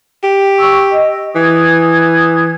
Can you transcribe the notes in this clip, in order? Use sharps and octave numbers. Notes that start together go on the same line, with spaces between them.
G4
C#6 E6
D#5
E3 D#6 G#6